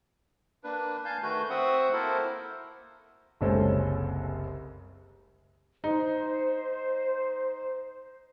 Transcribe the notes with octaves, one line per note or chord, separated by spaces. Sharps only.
A#3 D4 B4
F5 G#5 A5 G6
D#3 A3 F#4 B4 G6
C4 F#4 C5 E5 F#5 D#6
A#3 E4 A4 A#4 C5
F#1 C2 C#3 G#3 A4 C5
D#4 C5